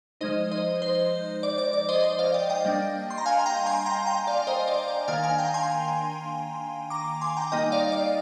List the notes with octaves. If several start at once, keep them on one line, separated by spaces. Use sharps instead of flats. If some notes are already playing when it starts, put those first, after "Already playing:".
F3 G#3 D#4 C5 D#5
C5 D#5
C5
D5
D5
D5
C5 D#5
C5 D#5
D5 F5
D#5 G5
D#5 G5
G3 A#3 D4
C6
A#5
F5 G#5
G5 A#5
G#5 C6
G5 A#5
G5 A#5
D5 F5
C5 D#5
D5
D5
D#3 A#3 D4 F5 G#5
F5 G#5
G5 A#5
G#5 C6
A#5 D6
G#5 C6
G5 A#5
G3 A#3 D#4 D#5 G5
D5 F5
D5